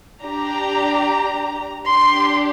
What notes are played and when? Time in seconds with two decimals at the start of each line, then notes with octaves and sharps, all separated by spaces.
0.22 D4 G4 A#5
1.89 D4 G4 C6